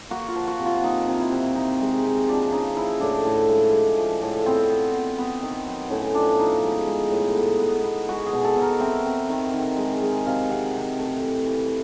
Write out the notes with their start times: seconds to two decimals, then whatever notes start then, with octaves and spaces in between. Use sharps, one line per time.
0.10 A#3 F#4
0.28 F4
0.35 F3
0.48 F#4
0.59 C3
0.66 F4
0.83 A#3 D#4
1.07 C3
1.19 E4
1.32 C3
1.55 C4 D#4
1.80 G#3
2.03 C4
2.28 F3 D4
2.52 C#3 D#4
2.77 F3 E4
3.00 A2 D4
3.25 A2
3.48 G#3
3.73 G#3
3.98 F3
4.22 A2
4.45 B3 C4
4.70 B3
4.93 B3
5.18 B3
5.42 D#3
5.66 F#3
5.90 A2 C#4
6.14 F3 D4
6.39 F3 D#4
6.63 G#3
6.87 G#3
7.11 A2
7.36 B3
7.59 B3
7.83 B3
8.09 G#3 F#4
8.26 G#4
8.33 B2
8.45 A4
8.56 B2
8.62 A#4
8.80 C4 E5
9.05 C4
9.29 D#3
9.54 D#3
9.77 G#3
10.01 G#3
10.26 C3 F5
10.50 C3 F#5
10.73 C3 G5
10.98 A3
11.22 E3
11.46 E3